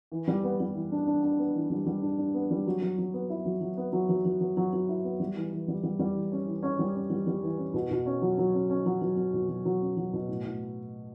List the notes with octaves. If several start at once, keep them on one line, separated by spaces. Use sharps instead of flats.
E3
G3
B3
G3
E3
D4
D4
D4
B3
E3
G3
G3
D4
D4
B3
G3
F#3
F#3
F#3
B3
E4
F#3
F#3
B3
F#3
F#3
F#3
F#3
F#3
F#3
E4
B3
G3
E3
E3
G3
G3
G3
E3
C#4
E3
C#4
G3
C#4
G3
G3
E3
C#4
B2
B2
C#4
F#3
F#3
C#4
C#4
F#3
F#3
F#3
B2
F#3
F#3
C#4
F#3
B2
A2
A2